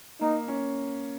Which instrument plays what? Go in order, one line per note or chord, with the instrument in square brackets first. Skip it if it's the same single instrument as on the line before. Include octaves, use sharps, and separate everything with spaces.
[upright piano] A#3 [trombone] D#4
[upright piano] C#4